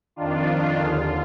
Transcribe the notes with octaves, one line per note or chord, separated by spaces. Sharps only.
F2 D#3 D4 F4
D#2 D3 F4 G#4